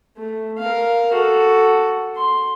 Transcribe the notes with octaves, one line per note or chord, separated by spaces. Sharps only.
A3
A#4 F5
F#4 A4
C6